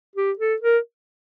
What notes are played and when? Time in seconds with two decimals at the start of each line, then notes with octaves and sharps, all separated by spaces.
0.16 G4
0.39 A4
0.62 A#4